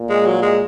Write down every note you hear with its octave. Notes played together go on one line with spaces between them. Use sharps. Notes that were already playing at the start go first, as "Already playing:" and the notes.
Already playing: A#2
G#3
F#3
G#3